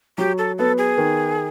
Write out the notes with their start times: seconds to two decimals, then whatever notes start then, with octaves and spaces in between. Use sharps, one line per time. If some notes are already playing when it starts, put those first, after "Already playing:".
0.18 F#3 G4
0.38 A4
0.58 B3 A4
0.78 G#4
0.98 D#3